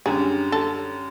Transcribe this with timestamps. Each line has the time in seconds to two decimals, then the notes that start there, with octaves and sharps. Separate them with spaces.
0.06 F#2 D3 G3 G#4
0.52 A4